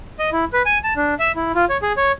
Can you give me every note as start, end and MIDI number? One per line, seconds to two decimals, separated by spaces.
0.19 0.30 75
0.32 0.45 64
0.53 0.62 71
0.66 0.78 80
0.84 0.93 81
0.96 1.14 62
1.19 1.32 76
1.36 1.52 64
1.55 1.65 65
1.69 1.77 73
1.82 1.93 68
1.97 2.12 73